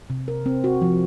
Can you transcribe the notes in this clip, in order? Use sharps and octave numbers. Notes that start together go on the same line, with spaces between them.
C3
A#4
C4
F#4
F3